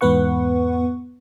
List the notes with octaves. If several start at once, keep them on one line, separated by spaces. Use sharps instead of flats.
E2 G#2 B3 B4 F#5 C#6